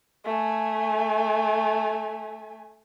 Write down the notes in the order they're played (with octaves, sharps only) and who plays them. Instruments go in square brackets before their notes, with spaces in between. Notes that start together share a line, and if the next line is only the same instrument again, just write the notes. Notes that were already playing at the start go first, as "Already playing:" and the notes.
[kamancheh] A3 G#5